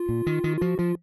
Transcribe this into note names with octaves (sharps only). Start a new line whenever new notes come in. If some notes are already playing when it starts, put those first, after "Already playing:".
Already playing: F4
A#2
D#3
D#3
F4
F3 F#4
F3 F4